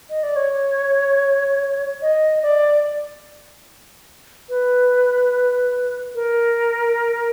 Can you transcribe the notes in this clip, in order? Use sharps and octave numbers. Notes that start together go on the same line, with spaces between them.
D#5
D5
C#5
D#5
D5
B4
A#4